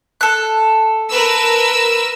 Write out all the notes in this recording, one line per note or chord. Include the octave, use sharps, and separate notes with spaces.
A4 F#6
A#4 B4 E6